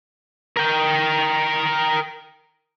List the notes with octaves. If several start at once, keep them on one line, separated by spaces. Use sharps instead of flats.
A#4 G5